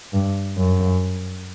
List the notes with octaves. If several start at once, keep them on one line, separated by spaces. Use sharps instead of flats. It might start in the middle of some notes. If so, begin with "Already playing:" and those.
G2
F#2